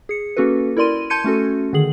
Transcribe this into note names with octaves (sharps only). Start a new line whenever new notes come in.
G#4 C#7
A#3 C#4 F#4 A4 B4
E4 A#4 D5 C6 D#7
A5 C6 G6 G#6 C#7 D#7
A3 C#4 F#4 A4
D3 D#3 G#4 F#7